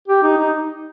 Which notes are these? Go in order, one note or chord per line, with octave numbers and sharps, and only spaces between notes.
G4
D#4
D#4